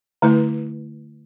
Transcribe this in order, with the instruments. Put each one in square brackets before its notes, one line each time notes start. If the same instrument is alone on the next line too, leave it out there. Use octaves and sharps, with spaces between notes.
[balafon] D3 A3 E4 B4